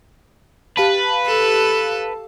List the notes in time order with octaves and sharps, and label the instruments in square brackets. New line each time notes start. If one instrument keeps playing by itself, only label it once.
[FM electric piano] G4 F5 A5 [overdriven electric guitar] B4
[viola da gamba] A4